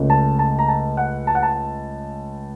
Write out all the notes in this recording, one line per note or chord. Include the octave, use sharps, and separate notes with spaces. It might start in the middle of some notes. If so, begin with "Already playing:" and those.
Already playing: C#2 C#3 A3
A5
A5
A#5
A5
F#5
A5
F#5
A5